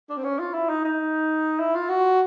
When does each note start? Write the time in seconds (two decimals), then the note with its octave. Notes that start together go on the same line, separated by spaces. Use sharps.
0.10 D4
0.17 C4
0.24 C#4
0.39 F4
0.54 E4
0.69 D#4
0.85 D#4
1.60 E4
1.76 F4
1.89 F#4